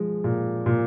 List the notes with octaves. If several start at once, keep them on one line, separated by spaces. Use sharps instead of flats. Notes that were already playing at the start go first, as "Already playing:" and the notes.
Already playing: F3 G#3
A#2
A#2